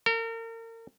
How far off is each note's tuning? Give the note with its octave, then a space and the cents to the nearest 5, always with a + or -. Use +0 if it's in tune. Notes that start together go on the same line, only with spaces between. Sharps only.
A#4 -35